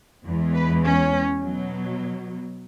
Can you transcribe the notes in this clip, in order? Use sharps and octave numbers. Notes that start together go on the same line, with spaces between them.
E2 E3 G#3
B4
C#4
B2 F#3